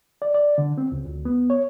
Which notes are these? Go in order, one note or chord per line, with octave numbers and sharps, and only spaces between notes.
D5
D5
D3
C4
C#2
D2
B3
C#5